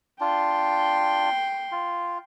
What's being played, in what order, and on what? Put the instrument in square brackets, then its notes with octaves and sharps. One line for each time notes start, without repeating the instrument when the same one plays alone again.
[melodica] D4 F4 [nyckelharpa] G5 C6
[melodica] F4